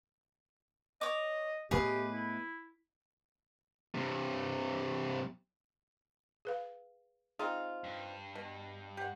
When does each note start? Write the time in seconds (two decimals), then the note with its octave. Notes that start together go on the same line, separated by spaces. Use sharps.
1.01 C#5 D#5 D6
1.71 A2 A3 B3 G4 G#4 B4 D#5
2.12 E4
3.95 G2 C3
6.45 G#4 B4 F5
7.39 C4 D#4 F4 G#4
7.84 G2
8.35 B2
8.97 G4 F#5